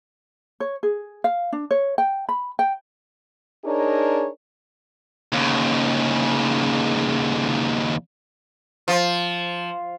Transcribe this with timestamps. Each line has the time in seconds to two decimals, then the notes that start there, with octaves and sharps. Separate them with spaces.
0.60 C#5
0.83 G#4
1.24 F5
1.52 D4
1.71 C#5
1.98 G5
2.29 B5
2.59 G5
3.65 D4 D#4 G#4 A#4 C#5
5.32 D#2 C#3
8.88 F3